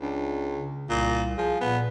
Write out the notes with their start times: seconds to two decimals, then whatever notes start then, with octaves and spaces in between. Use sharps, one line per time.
0.01 C#2 D4
0.54 C#3
0.90 C2 A#2
1.38 F3 G#4
1.61 A#2 B3